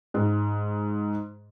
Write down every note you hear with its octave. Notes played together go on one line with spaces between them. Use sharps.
G#2